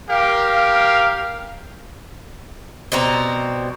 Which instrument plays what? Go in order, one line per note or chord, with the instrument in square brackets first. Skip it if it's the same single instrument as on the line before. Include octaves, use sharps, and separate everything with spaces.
[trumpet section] G4 A#4 F5
[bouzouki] B2 G3 C4 A#5